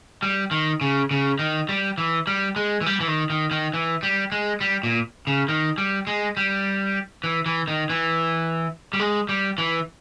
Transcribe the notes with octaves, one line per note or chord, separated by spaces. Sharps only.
G3
D#3
C#3
C#3
D#3
G3
E3
G3
G#3
E3
G3
E3
D#3
D#3
D#3
E3
G3
G#3
G3
A#2
C#3
D#3
G3
G#3
G3
E3
E3
D#3
E3
G3
G#3
G3
E3